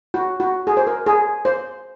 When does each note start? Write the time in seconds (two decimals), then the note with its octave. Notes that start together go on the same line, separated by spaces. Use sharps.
0.14 F#4
0.40 F#4
0.67 G#4
0.77 C5
0.87 A#4
1.06 G#4
1.45 C5